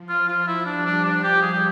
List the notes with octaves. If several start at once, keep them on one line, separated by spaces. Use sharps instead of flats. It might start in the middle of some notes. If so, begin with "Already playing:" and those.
Already playing: F3
F4
F4
E4
G3 D4
D4
D4
G4
G#4
G4